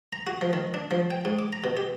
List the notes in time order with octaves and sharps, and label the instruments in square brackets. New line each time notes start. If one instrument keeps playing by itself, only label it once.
[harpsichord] A#5
F#4
F3
D#3
D4
F3
G5
G#2
D6
A#5
B2
G4